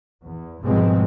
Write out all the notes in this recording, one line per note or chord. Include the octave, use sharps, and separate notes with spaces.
E2
G#2 B2 F3 G3 G#3 C4